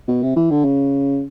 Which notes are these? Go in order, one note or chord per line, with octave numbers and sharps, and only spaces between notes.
B2
C3
E3
D3
C#3